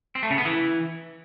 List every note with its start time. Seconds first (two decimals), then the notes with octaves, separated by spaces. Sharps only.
0.15 C4
0.23 A3
0.30 C#3
0.38 B3
0.45 E3